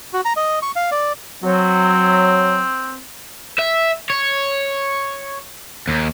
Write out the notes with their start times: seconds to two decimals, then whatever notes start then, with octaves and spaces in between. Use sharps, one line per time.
0.13 F#4
0.25 A#5
0.37 D#5
0.62 C#6
0.76 F5
0.91 D5
1.43 F#3 C4
3.59 E5
4.10 C#5
5.88 D#2